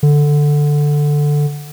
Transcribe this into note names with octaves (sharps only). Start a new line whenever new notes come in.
D3